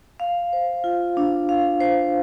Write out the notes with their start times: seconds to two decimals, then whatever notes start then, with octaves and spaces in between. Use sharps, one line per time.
0.20 F5
0.53 C5
0.84 F4
1.17 D4
1.49 F5
1.80 C5